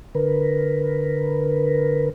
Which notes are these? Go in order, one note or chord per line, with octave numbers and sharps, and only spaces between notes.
D3 A#4 B4